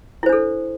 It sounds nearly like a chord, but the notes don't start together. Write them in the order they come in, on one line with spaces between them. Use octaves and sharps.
E4 C5 D4 A4